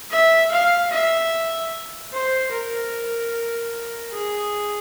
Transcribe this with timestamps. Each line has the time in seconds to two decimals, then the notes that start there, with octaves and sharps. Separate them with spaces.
0.10 E5
0.51 F5
0.91 E5
2.12 C5
2.52 A#4
4.11 G#4